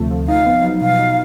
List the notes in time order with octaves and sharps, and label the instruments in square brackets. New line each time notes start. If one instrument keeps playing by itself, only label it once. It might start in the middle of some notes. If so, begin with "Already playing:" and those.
Already playing: [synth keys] D2 C3 F3 A3
F3
[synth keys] D#4 [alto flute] F5
[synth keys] B3
F#3
[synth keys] B2 [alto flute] F5
[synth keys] D#4